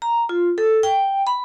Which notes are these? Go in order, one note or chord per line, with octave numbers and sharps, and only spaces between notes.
A#5
F4
A4
G5
B5